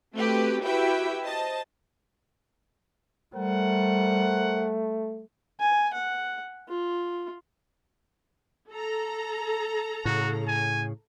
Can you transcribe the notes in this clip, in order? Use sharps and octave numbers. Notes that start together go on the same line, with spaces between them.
A3 C4 F#4 G4 B4
E4 F#4 G4 B4 E5 G5
C5 D#5 A5
G3 A3 A#4 C5 F#5
G#5
F#5
F4
A4 A#5
A2 C#3 F#4
G#5